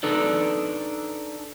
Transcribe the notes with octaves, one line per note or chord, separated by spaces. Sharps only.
D4 D#4 A4 B4 D5